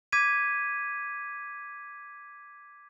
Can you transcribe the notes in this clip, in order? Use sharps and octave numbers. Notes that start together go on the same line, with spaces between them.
D6 G#6 B6 D#7